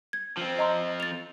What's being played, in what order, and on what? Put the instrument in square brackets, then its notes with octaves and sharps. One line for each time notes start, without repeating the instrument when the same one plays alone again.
[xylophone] G#6
[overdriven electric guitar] F3 C4
[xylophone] D#5 A#5 C6
A6 F7